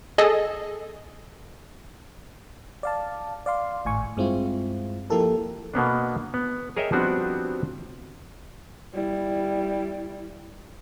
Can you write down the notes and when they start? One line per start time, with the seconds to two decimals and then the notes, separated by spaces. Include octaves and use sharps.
0.18 G#4 A4 D#5
2.83 D5 F5 A5
3.46 D5 F5 C6
3.85 G#1 A2 G#5 C#6
4.17 G2 G#3 C4 E4 F4
5.10 F3 A#3 E4 G4 A4 A#4
5.74 B2 A#3 B3 D4
6.34 B3
6.76 G#4 A#4 C#5 D#5 E5 G5
6.92 F3 G3 B3 C4 D4 F#4
8.94 G3 E4